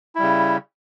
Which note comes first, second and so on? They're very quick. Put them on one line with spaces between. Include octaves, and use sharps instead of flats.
E4 G3 C#3